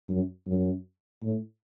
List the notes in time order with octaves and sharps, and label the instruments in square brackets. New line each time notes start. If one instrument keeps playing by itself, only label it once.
[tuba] F#2
F#2
A2